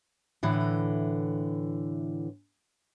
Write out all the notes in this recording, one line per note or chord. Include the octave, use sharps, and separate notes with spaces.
A2 D3 E3